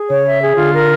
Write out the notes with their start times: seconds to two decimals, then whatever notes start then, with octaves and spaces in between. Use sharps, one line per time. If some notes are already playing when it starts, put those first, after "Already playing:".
Already playing: G#4
0.09 C#3 C#5
0.26 E5
0.42 G#4
0.57 D3 F4
0.73 A#4